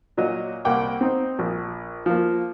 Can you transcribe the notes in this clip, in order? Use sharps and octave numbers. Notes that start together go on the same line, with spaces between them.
A#2 F#3 D#5
C2 A#3 F#5 G5 D6
C4 D#4
A#1
F3 A#3